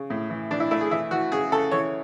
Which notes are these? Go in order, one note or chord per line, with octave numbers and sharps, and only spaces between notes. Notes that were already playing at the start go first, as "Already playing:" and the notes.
Already playing: C#3
A2
E3
E3 D4
E4
A3 E4
G#4
E3 E4
E3 F#4
C#3 G#4
C#3 A4
E3 C#5